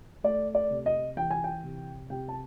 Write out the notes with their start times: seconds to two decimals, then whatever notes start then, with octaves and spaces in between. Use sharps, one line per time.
0.24 A3 D5
0.55 D5
0.71 C3
0.86 D#5
1.17 E3 G5
1.31 G#5
1.44 G5
1.64 C3
2.10 C3 G5
2.29 A5